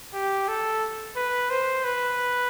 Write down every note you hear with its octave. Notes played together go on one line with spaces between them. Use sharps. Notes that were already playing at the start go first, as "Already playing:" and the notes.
G4
A4
B4
C5
B4